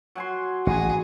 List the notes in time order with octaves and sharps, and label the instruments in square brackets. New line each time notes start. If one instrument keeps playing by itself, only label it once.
[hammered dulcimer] F#3 G#5 C6
[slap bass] A1 [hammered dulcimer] F#4 G#5 [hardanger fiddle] G#4